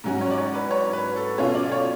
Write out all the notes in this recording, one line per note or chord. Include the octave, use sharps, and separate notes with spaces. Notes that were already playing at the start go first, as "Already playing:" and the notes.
G#2 F#3 C#4 F#4
C#5
D5
C#5
B4
C#5
B4
A4
B2 A3 C#4 F4 C#5
D5
C#5